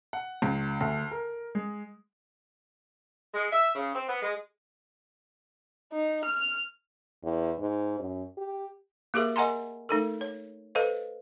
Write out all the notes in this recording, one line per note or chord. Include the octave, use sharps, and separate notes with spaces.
F#5
C#2
D2
A#4
G#3
G#3
E5
C#3
C4
B3
G#3
D#4
F6
E2
G#2
F#2
G4
A#3 G4 G#4 A#4 E5
A#4 D#5 F#5 G#5 A#5 C6
A3 D#4 A4 A#4
C#5
A4 B4 C5 D#5 F5